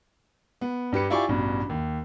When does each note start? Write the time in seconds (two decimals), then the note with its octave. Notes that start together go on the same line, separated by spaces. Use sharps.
0.61 B3
0.92 G2 G4 B4 C#7
1.10 E4 F4 G4 D5 G#5 C#6
1.28 A1 G2 B2
1.69 D#2